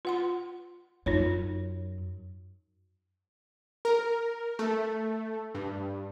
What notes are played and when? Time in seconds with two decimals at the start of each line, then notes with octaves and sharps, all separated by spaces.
0.05 F4 F#5 C6
1.06 F#2 D#4 F4 C#5
3.85 A#4
4.59 A3
5.55 G2